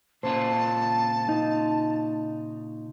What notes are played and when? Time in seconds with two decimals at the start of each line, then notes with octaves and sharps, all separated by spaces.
0.23 A#2 C#3 F4 C5 A5
1.29 D#4